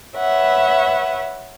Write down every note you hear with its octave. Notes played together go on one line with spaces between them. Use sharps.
B4 C#5 E5 F#5